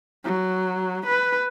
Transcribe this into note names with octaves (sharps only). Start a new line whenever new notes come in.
F#3
B4